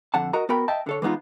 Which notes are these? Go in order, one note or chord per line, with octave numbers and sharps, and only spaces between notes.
F2 D3 F#5 A5
F#4 A#4 D#5 A#5
B3 F#4 A#4 G5 B5
D#5 E5 G5 A5
D3 A4 C#5
E3 G#3 B3 D#4 F4